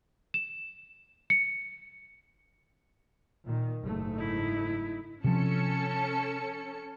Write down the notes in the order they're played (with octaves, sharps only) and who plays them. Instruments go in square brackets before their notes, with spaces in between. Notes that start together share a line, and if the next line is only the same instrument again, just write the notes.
[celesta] E7
C#7
[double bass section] A#2 D#3
F#1 G#2 A3
[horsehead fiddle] D#4 E4
[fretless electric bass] C3 F3 [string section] C#4 A4 C#7